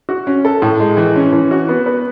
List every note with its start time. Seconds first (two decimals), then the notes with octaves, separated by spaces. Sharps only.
0.09 F#4
0.27 C#4
0.45 A4
0.62 A2
0.80 G#3
0.97 E3
1.16 C#4
1.33 E3
1.51 F#4
1.69 B3
1.86 B4